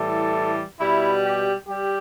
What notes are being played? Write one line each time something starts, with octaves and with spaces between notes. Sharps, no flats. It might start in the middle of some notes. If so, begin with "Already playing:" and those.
Already playing: A2 E3 G3 A4
B2 G3 E4
G4
G3 G4